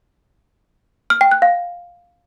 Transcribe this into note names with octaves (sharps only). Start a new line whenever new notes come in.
F6
G5
F#6
F5